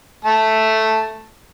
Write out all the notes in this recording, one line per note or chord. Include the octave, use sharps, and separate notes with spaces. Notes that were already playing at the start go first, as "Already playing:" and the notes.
A3 A5